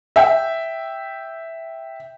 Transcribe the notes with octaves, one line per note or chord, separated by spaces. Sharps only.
E5 G5